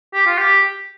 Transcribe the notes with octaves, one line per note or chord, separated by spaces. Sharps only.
G4
F4
G4